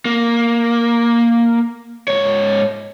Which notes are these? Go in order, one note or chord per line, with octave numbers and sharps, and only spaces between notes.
A#3
G#2 C#5